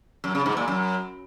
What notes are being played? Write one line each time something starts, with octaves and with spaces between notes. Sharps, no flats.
F#2
C#3
G#2
A#2
F#2